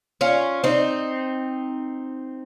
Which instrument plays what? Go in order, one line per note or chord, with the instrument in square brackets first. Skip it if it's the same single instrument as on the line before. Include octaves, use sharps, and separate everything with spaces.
[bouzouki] C#4 F4
C4 D#4